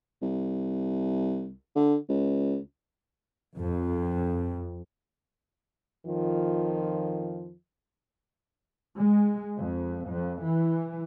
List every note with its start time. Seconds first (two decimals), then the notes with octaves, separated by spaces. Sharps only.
0.21 C2
1.75 D3
2.09 C#2
3.56 F2
6.06 F2 D#3 F3 F4
8.98 G#3
9.57 F2
10.06 F2
10.44 E3